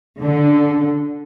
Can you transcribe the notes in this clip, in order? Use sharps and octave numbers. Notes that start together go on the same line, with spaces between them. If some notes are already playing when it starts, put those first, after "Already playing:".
D3